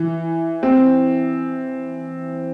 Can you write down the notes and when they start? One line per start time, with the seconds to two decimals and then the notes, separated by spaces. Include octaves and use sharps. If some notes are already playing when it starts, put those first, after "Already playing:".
Already playing: E3
0.63 C4